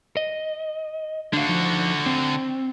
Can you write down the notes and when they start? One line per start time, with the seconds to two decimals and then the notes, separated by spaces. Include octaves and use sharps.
0.17 D#5
1.33 D3 D4 F#4 F5
1.49 F3 D#4
2.06 C4